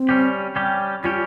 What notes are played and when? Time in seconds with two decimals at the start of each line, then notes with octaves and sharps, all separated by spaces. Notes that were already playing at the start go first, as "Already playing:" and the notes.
Already playing: C4
0.09 G3 C#4 G4
0.56 G3 C#4 G4
1.03 G3 C#4 F4 G4